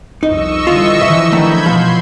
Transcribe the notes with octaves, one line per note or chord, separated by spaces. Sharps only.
C2 F2 D#4 D#5 C#6 E6
D3 E3 G3 F4
D3 E3 F3 E5
D#3 A3 B5 G6 G#6
B2 F3 F#3 C6